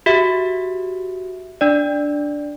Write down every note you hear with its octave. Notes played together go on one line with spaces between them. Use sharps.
F#4 G4 E5
D4 D5